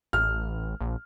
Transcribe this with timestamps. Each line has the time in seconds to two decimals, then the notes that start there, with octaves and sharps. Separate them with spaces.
0.13 A1 F6
0.81 A#1